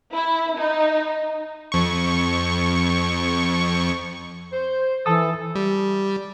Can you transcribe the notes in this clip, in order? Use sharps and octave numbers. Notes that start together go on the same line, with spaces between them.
E4
D#4
F2 C#6
C5
E3 A4 A5 D#6
G3